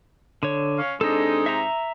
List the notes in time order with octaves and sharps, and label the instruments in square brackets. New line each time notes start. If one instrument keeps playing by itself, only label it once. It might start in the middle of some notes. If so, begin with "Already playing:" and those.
[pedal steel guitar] D3 C#5
[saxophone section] C#4 F5
[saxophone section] C3 G#3 D#4 [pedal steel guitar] D4 A4
[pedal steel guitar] E5 A#5